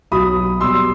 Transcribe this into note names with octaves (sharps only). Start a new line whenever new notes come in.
B1 B2 F#3 B5 D#6
B1 B2 G3 C6 E6